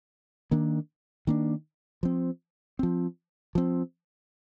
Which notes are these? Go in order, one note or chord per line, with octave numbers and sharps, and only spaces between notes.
D#3 A#3 D4
D#3 A#3 D4
F3 C4
F3 C4
F3 C4